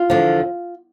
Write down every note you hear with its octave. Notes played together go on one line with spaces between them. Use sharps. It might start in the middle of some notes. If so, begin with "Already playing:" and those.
Already playing: F4
E2 D3 F3